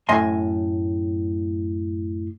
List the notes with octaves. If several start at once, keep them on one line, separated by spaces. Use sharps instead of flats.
F#2 A2 D#5 E5 G#5 C6